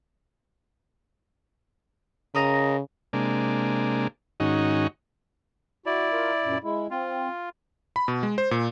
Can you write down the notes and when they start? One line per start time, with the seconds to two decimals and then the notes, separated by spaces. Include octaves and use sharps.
2.35 C#3 A#4 D#5 A#5
3.13 C3 G#3 A#3 D4
4.40 G#2 D#3 C#4 D#4 F#4
5.86 E4 F#4 D5
6.12 F4 A#4
6.44 F#2 A#2
6.64 G#3 E4
6.91 C4 F4
7.96 B5
8.08 B2
8.23 G#3
8.38 C5
8.51 A#2